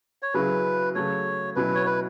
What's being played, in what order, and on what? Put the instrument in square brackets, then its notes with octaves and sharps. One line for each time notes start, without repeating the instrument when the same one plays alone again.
[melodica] C#5
[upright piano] C#3 F#3 C#4 E4 G#4 [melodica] B4
[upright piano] C#3 F#3 A3 [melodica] C#5
[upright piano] B2 F#3 C#4 E4 [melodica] B4
[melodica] C#5
B4